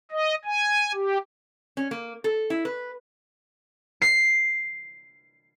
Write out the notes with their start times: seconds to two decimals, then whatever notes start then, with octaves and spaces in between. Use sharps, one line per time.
0.12 D#5
0.45 G#5
0.94 G4
1.77 C#4
1.91 A#3
2.24 A4
2.50 E4
2.65 B4
4.02 C7